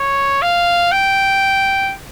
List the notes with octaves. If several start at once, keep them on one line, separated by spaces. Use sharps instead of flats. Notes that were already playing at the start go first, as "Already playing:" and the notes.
Already playing: C#5
F5
G5